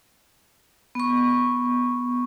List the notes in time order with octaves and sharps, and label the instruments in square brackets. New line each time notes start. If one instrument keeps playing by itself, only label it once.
[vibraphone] B3 C#6